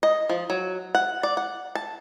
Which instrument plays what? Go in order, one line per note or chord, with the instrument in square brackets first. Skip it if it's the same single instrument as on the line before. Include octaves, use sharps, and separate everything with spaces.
[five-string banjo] D#5
F3
F#3
F#5
D5
F#5
A5